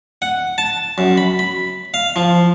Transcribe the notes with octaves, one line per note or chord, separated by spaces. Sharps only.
F#5
A5
F#2
B5
B5
F5
F3